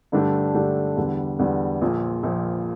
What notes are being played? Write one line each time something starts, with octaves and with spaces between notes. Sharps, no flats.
G2 D3 A3 D4 G4
G2 D3 A3 D4 G4
E2 D3 G3
E2 D3 G3
A#1 A#2 F3
A#1 A#2 F3